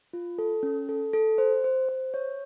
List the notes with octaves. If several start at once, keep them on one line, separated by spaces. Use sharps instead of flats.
F4
A4
C#4
A4
A4
C5
C5
C5
C#5